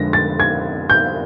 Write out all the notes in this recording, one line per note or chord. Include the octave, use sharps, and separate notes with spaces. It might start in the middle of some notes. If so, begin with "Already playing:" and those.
Already playing: F2 D3 F3 G#3 A#6
A6
G#6
G6